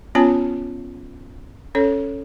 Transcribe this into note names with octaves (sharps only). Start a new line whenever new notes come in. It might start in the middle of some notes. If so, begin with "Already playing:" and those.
B3 C#4 F4 C#5 G#5 A5
C#4 A4 C#5